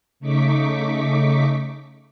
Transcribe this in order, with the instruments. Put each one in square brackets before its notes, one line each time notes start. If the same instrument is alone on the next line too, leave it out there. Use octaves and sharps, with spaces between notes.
[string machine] C#3 A3 D#4 C#6 D6 B6